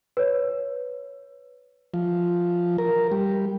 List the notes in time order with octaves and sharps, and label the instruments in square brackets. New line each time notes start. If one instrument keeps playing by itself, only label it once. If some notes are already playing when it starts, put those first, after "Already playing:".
[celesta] B4 C#5
[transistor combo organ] F3
A#4
G3